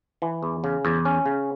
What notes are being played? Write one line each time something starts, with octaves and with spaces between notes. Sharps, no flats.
E3
E2
C#3
E2
C#4
C#3